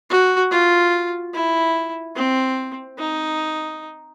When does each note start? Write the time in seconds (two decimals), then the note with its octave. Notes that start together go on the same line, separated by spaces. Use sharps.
0.10 F#4
0.51 F4
1.34 E4
2.16 C4
2.99 D#4